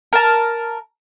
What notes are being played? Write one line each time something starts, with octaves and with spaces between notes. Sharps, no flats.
A#4 A5